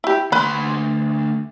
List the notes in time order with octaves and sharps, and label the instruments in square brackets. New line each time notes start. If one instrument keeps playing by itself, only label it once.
[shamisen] E4 G4
[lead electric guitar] D2 C6 [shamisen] B4 B5